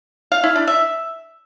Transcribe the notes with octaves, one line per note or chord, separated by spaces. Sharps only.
F5
E4
D4
E5